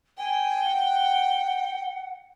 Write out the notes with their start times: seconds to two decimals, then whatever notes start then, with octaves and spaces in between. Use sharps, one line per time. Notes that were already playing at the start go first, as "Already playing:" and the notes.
0.18 G5 G#5
0.64 F#5